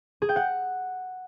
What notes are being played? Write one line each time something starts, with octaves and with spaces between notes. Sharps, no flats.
G#4
G5
F#5